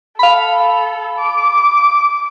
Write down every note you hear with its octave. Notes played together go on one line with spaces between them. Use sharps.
A4 F5 B5
D6